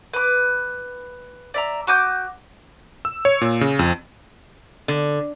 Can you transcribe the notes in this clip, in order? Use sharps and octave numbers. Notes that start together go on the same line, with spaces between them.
B4 D6
D5 E5 A#5
F#4 D6 D#6 G6
E6
C#5
A#2
C#3
F2
D3